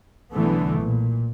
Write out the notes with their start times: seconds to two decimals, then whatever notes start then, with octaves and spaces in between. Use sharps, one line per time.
0.32 B1 D3 E3 A3 B3
0.79 A#2